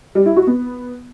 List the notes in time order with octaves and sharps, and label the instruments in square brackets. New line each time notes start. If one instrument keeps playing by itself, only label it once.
[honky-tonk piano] G3
E4
F#4
B3